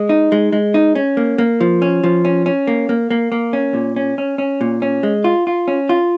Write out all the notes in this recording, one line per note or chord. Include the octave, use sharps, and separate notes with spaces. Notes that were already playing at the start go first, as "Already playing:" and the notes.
Already playing: G#3
D#4
G#3
G#3
D#4
C#4
A#3
A#3
F3
C#4
F3
C#4
C#4
A#3
A#3
A#3
A#3
C#4
A#2
C#4
C#4
C#4
A#2
C#4
G#3
F4
F4
C#4
F4